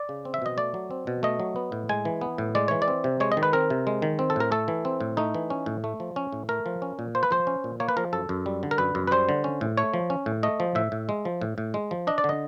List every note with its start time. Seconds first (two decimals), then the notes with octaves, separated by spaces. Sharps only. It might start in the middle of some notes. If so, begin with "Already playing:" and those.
Already playing: D5
0.09 C#3
0.25 C4
0.34 E5
0.42 B2 D#5
0.58 A3 D5
0.74 F#3
0.91 C4
1.07 B2
1.23 A3 D#5
1.40 F#3
1.56 B3
1.72 A2
1.89 G#3 G#5
2.05 E3
2.21 B3
2.38 A2
2.55 G#3 D5
2.68 E3 C#5
2.82 D5
2.88 C4
3.04 C3
3.20 G#3 C#5
3.32 D#5
3.37 D#3
3.43 B4
3.53 C4 A#4
3.70 C3
3.87 G#3
4.02 D#3
4.19 C4
4.30 A4
4.36 A2 A#4
4.52 A3 A4
4.68 E3
4.85 C4
5.01 A2
5.17 A3 D#4
5.34 E3
5.50 C#4
5.66 A2
5.84 A3
6.00 F3
6.16 C#4
6.32 A2
6.49 A3 A#4
6.66 F3
6.82 C#4
6.99 A#2
7.15 A#3 C5
7.23 B4
7.31 F3 C5
7.47 C#4
7.64 A#2
7.80 A#3 C#5
7.89 B4
7.97 F3 A#4
8.13 F#2 A4
8.29 F#2
8.46 G3
8.63 D3
8.71 A#4
8.78 F#2 B4
8.95 F#2
9.07 B4
9.11 G3 C5
9.29 D3
9.44 C#4
9.61 A2
9.77 A3 C#5
9.94 F3
10.10 C#4
10.26 A2
10.43 A3 D#5
10.60 F3
10.75 A2 E5
10.92 A2
11.09 G#3
11.25 F3
11.41 A2
11.58 A2
11.74 G#3
11.91 F3
12.07 D4 D#5
12.18 D5
12.24 D3
12.29 D#5